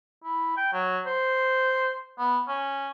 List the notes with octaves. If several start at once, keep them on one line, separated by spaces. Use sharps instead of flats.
E4
G5
F#3
C5
B3
C#4